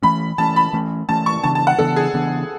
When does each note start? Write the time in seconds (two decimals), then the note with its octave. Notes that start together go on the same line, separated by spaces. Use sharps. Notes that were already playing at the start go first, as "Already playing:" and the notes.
0.03 E3 A3 C#4 B5
0.38 E3 A3 C#4 A5
0.56 B5
0.73 E3 A3 C#4
1.09 E3 A3 C#4 A5
1.26 C#6
1.43 C#3 E3 B3 D4 A5
1.55 A5
1.67 F#5
1.79 C#3 E3 B3 D4 A4
1.96 G#4
2.14 C#3 E3 B3 D4